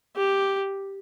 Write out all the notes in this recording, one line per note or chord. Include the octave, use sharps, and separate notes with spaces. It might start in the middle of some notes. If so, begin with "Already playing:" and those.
G4